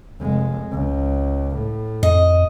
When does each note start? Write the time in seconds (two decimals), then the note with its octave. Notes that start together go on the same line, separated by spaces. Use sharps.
0.20 F1 G#3
0.72 C#2
1.56 A2
2.03 F2 D#5